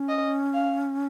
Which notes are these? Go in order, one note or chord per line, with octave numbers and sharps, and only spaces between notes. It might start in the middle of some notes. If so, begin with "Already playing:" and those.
Already playing: C#4
D#5
F5